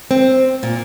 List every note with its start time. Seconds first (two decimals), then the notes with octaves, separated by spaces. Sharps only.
0.11 C4
0.63 A#2